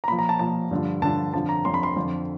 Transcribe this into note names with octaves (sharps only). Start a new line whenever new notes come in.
A#5
A#2 F3 B5
A#5
A5
A#2 F3 A5
G2 D3 F3
G2 D3 F3 A5
F2 D3 F3 A5
A#5
F2 D3 F3 C6
B5
C6
F2 D3 F3